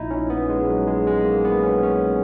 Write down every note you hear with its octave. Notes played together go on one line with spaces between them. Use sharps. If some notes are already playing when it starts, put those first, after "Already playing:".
Already playing: A#1 A#2 D#4 E4
C#4
B3
G#3
F#3
G#3
G#3
A#3
B3
C#4
C#4